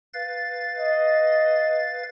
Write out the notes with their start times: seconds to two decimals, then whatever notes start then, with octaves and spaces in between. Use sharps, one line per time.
0.14 B4 F5 A6
0.78 D#5